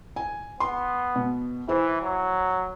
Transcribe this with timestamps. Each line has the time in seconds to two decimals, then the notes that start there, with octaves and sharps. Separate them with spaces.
0.16 G#5
0.60 B3 C6
1.16 B2
1.68 E3 E4 C5
2.02 F#3